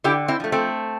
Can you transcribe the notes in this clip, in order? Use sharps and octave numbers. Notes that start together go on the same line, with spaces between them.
D3 E4 G4
C4 E4
F3 A3
A3 C4